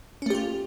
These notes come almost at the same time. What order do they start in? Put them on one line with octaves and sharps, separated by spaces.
C#4 A3 G4 F4